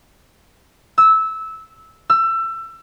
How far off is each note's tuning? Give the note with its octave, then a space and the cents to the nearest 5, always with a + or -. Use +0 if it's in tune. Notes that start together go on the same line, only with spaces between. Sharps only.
E6 -15
E6 +25